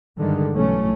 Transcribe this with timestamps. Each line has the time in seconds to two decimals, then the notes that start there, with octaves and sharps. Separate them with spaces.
0.18 G2 D3 D#3 G#3
0.53 B1 E3 A3 C#4